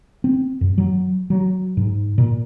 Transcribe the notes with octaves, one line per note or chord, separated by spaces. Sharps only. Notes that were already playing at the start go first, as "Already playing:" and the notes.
C4
F#2
F#3
F#3
G#2
A#2